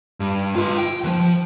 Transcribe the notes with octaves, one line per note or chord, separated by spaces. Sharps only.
G2
F4 B4
G5
D#2 F3